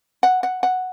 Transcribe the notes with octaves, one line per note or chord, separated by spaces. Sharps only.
F#5
F#5
F#5